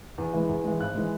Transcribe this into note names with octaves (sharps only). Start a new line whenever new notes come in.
E2
E3 G#3
E2
E3 G#3
G#1 F#6
E3 G#3